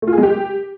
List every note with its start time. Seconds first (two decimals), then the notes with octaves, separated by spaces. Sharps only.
0.02 A3
0.07 F4
0.13 G#4
0.18 G#3
0.23 G4